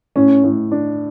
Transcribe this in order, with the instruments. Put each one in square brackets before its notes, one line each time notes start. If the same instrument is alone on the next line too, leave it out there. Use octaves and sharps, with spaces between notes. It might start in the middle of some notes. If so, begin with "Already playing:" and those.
[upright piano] A2 [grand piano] C#4
[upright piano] A2
D4